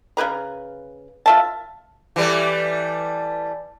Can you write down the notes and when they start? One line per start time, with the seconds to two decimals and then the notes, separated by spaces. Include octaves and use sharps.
0.17 C#3 E4 B4 A#5
1.26 F4 E5 A5
2.16 E3 G3 A3